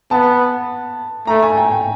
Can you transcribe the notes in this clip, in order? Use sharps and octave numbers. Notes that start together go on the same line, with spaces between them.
B3 A5
A3 A#5
G#5
G5
G5